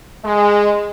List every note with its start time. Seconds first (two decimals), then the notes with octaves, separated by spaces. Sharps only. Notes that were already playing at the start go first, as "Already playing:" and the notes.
0.25 G#3